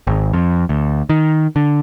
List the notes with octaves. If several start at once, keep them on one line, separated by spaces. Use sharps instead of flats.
G#1
F2
D2
D#3
D3